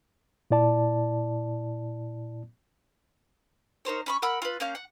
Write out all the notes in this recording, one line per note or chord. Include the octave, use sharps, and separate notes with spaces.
A#2 E4 D5 A5
D#4 A#4 C5 C#5
C#4 B5 C#6
A#4 F#5 B5 E6
F4 B4
A#3 C#4 F5 G6
F#5